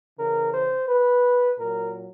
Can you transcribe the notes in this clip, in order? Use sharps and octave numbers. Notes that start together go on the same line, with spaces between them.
C#3 E3 A#4
C5
B4
A#2 F#3 A#4